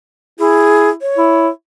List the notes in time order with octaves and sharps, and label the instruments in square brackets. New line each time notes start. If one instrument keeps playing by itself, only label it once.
[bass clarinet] E4 [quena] G#4
[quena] C#5
[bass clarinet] E4